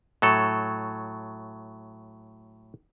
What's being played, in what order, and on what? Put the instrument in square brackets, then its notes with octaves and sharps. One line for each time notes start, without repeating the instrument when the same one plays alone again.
[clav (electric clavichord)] A2 F#3 A4